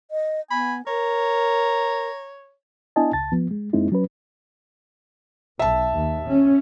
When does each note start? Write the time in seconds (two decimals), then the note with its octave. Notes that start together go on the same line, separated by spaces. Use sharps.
0.11 D#5
0.51 B3 G#5 B5
0.87 A#4 C#5 A#5
2.96 B3 D4 E4 D#5 G#5 A5
3.13 C#2 A5 A6
3.32 F3 B3
3.51 G#3
3.73 F#2 G#3 A#3 C4 D#4 E4
3.92 F#3 C#4 B4
5.59 B1 E5 A5
5.94 D#2
6.27 C#4